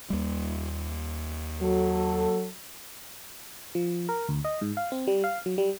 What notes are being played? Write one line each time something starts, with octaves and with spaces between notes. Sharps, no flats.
D#2 G3
F#3 A4
F3
A#4
D2
D#5
G#2
F5
C4
G3
F5
F#3
G3